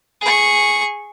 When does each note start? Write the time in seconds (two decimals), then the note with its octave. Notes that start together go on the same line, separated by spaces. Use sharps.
0.21 G#4 C#6